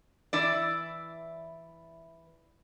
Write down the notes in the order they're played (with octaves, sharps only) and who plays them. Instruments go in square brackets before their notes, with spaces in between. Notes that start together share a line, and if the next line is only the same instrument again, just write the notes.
[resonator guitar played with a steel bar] E3 E4 D5